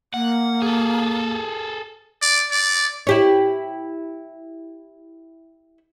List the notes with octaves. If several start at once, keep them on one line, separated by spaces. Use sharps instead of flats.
A#3 F#5
G#4 A4
D5
D5
E4 G4 C#5